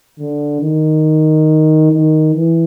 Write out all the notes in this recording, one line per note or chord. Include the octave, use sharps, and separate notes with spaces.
D3
D#3
D#3
E3